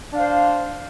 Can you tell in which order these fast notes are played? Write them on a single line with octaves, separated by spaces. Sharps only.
D4 F5 C5